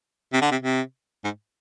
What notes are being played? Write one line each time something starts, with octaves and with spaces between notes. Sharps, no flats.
C3
D3
C3
C3
G#2